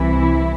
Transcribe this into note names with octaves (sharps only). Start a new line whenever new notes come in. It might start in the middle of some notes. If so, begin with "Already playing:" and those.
Already playing: C2 C3 E3 E4